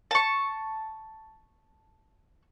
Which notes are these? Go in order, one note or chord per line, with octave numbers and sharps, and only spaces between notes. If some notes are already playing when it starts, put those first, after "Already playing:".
A5 C#6